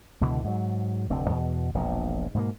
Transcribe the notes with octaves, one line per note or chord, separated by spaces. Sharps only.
C#2 B2 D3 E3
G#2 F#3
F1 D2 C4
E2 B2
E1 A#1 A#2
G#2 B2 A3 A#3